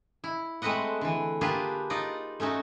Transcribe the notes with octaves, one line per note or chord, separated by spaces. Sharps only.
E4
G#3 A3 C4 B4 D#5 F#5
D3 E3
A#3 D4 F4 G4 G#4 B4
D#4 F4 D5 D#5
A3 C#4 D#4 F#4